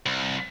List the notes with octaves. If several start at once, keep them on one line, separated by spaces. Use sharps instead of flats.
C2